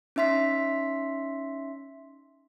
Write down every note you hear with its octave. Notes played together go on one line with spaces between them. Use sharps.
C#4 D#4 E5 C6 B6